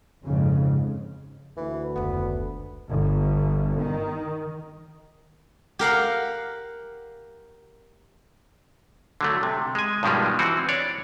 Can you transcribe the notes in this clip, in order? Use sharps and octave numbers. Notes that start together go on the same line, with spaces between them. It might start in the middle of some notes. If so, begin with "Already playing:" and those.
F2 G#2 C#3
D2 E3
F1 C#2 B3
G1
D#3
G4 A#4 F5 F#5
D3 F#3 A3
C3
G#3 G#5
G2 B2 D#3 F3 G3 G#3
E3 C4 F#4
D4 C#5 D5